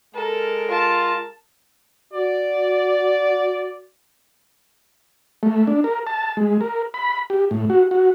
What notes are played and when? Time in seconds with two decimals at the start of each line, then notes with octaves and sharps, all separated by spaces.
0.14 G#3 A4 A#4
0.71 F4 A5
2.14 F#4 D5
5.43 A3
5.67 D4
5.84 A#4
6.07 A5
6.37 G#3
6.61 A#4
6.94 B5
7.30 G4
7.51 A2
7.70 F#4
7.91 F#4